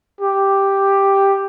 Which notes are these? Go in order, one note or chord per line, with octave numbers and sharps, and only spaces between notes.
G4